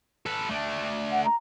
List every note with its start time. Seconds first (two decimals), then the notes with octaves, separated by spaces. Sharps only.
0.26 A4 B4
0.49 A3 D4
1.12 F#5
1.25 A#5